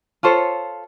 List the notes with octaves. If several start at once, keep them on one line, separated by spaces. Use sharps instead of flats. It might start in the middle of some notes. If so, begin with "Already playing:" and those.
F4 A4 C5 C#5